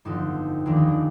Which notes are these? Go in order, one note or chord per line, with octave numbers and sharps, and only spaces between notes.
G1 F2 D3 D#4
F1 D#2 D#3 D4
D#4
D4